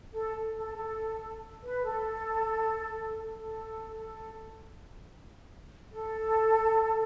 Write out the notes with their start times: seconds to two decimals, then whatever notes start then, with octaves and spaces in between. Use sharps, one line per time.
0.13 A4
0.56 A4
0.77 A4
1.64 B4
1.84 A4
3.35 A4
3.99 A4
5.93 A4